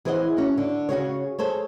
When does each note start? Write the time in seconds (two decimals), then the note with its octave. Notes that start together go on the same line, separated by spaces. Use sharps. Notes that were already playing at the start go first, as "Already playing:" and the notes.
0.05 E3 G#4 C5 C#5 D#5 F#5
0.37 C#4 F#4
0.58 D3
0.89 C#3 F#4 G#4 C#5
1.39 G#4 A4 C5 C#5